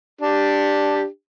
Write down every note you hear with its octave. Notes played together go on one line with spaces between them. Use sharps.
D4 G4